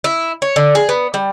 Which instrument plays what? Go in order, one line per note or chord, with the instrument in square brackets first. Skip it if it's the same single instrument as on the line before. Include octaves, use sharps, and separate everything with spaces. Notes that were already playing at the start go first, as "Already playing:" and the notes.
[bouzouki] E4
C#5
D3
G#4
B3
G3